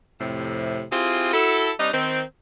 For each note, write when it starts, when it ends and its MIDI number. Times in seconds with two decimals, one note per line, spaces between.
0.21 0.85 41
0.21 0.85 45
0.21 0.85 48
0.92 1.33 60
0.92 1.33 64
0.92 1.33 65
0.92 1.33 67
0.92 1.33 68
1.33 1.73 64
1.33 1.73 66
1.33 1.73 69
1.79 1.93 55
1.79 1.93 60
1.79 1.93 62
1.79 1.93 63
1.93 2.23 51
1.93 2.23 60